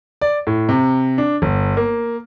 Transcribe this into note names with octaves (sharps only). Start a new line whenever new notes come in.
D5
A2
C3
D4
G1
A#3